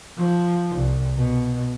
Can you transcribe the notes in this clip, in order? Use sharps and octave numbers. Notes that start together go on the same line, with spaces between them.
F3
C2
B2